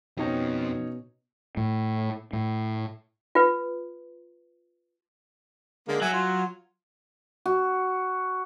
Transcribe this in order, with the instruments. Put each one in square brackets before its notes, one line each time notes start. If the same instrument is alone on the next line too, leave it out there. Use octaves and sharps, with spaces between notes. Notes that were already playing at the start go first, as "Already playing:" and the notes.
[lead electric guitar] F2 C4 [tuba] B2 [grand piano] C#4 D#4 C#5
[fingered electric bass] A2
A2
[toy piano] F4 B4
[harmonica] D3 G#3 A#3
[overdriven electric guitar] F#3 [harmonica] E5 G#5
[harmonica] F4
[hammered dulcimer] F#4